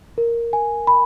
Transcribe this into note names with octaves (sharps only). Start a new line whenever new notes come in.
A#4
G#5
B5